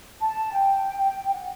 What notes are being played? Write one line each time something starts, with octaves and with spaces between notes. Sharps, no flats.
A5
G5
F#5